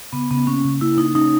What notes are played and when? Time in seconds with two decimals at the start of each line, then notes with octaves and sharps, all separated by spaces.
0.13 C#3 B3
0.31 C#3 B3
0.47 A#3 C#4
0.64 C#3
0.81 A#3 E4
0.97 A#3 D#4
1.15 C#4 D#4